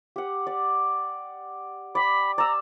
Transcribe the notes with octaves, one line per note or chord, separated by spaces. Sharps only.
G4 F#5
D5
D5 G5 B5
D5 A#5 E6